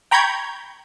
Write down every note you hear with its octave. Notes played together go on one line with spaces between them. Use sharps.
G5 A#5 B5 C#6 G6 G#6